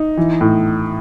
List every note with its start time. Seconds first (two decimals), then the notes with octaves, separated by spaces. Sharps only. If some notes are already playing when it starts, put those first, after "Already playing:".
Already playing: D#4
0.17 E3
0.41 A2